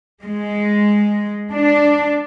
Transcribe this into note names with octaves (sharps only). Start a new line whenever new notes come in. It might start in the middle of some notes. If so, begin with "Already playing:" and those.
G#3
D4